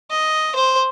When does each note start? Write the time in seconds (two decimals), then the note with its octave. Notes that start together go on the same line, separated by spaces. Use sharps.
0.11 D#5
0.56 C5